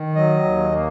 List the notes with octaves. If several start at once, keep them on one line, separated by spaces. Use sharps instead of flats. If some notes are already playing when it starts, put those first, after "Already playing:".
Already playing: D#3
F#3 D#5
D#2
A#3